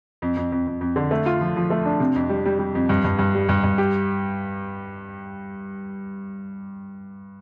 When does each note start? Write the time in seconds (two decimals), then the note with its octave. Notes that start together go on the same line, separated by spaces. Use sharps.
0.22 F2
0.37 F2
0.52 F2
0.67 F2
0.81 F2
0.96 D3
1.11 A3
1.26 F4
1.41 F3
1.56 F3
1.70 A3
1.86 D4
2.00 C3
2.15 F2
2.29 G3
2.45 G3
2.59 G3
2.75 F2
2.89 G2
3.04 G2
3.19 G2
3.35 G3
3.49 G2
3.64 G2
3.78 G4